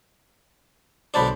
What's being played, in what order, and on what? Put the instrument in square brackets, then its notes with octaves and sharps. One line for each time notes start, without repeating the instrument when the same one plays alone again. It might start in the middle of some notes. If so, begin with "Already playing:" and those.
[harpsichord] B1 D3 D4 [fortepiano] C5 A5 B5